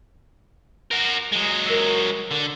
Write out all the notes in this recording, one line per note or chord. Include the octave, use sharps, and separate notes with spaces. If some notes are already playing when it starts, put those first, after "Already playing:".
F#4 A#4
F#3 G#3
A#4 E6
D3